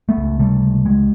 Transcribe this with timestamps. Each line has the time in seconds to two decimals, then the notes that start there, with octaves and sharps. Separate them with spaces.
0.09 A3 B3
0.17 C#2
0.39 C3 G3 A3
0.62 C#2
0.85 C#2 F#3 G#3